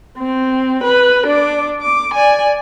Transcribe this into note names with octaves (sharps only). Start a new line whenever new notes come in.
C4
B4
D4 D6
D6
D5 G#5